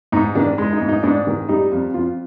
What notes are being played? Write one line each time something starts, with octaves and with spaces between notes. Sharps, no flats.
G#2 D#4
D#3 D4
G#3
D#4
G#2
D#4
G#2 D4
D#3
G3 D#4
F2
F2 F4